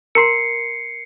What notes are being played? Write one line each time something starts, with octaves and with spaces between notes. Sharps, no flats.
A#4 A#5 C6 C7 C#7